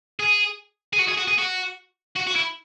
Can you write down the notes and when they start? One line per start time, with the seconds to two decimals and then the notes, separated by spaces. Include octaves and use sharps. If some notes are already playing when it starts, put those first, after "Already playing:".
0.19 G#4
0.93 G#4
0.99 F#4
1.08 G#4
1.17 F#4
1.27 G#4
1.38 F#4
2.16 F#4
2.27 F#4
2.36 E4